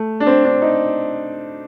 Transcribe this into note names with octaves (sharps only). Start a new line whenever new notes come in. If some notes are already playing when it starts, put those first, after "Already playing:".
Already playing: A3
D4
C4
D4
D#4